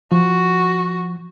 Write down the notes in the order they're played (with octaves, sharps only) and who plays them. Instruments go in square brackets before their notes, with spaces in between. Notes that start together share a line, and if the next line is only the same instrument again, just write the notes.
[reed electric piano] F3 [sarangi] F#4